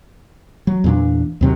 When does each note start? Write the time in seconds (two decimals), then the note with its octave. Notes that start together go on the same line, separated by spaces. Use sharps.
0.67 F#3
0.84 E2 A#2 D4
1.41 D#2 C3 F#3